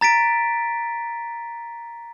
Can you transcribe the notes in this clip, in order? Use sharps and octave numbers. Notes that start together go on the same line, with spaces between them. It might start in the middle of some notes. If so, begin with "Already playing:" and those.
A#5 A6 B6 D7